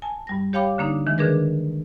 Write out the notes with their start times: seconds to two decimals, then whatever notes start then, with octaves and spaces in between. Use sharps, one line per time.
0.02 G#5 A5
0.27 G2 G3 A#6
0.53 G4 C#5 F5 G5 B5 D6
0.78 D3 A#3 D4 D#4
1.07 D#3 E3 G#3 D4
1.18 D3 D#3 D4 G#4 A#4 B4